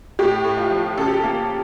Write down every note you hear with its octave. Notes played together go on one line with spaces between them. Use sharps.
A2 G4
A2
F4
F3
C#3 A4
G4
A4
A#3